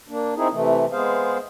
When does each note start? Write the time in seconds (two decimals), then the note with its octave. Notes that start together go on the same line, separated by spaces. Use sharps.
0.08 A#3 D4
0.36 C4 D#4 E4 G#4
0.52 C3 E3 A3
0.92 G#3 B3 G#4 C5 F5